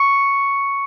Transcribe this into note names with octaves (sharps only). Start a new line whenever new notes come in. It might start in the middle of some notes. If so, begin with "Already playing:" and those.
Already playing: C#6 C#7